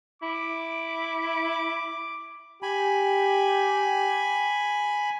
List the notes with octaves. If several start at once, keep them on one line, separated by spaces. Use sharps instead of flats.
E4 D6
G4 G#5 B5